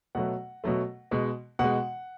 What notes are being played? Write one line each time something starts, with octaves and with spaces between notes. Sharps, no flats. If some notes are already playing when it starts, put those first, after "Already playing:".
B2 F#3 A3 F#5
B2 F#3 A3
B2 G#3
B2 G#3 F#5